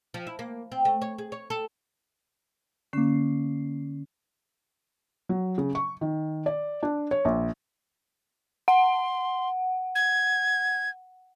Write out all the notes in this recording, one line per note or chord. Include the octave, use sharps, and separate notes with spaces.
F3
E4
A#3
C4
A3
C#5
G#4
C#5
A4
D3 A#3 C#4 C7
F#3
C#3
C#6
D#3
D5
D4
C#5
A#1
F#5 C6
G#6